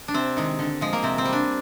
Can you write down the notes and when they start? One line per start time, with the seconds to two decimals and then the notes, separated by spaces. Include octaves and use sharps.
0.08 D4
0.14 C3 C4
0.37 D#3 G#3
0.59 D3
0.81 F3 G#3
0.93 A#3
1.03 C3 C4
1.18 C4
1.25 G3
1.33 D4